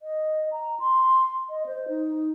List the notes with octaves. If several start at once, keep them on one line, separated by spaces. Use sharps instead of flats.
D#5
A#5
C6
D#5
C5
D#4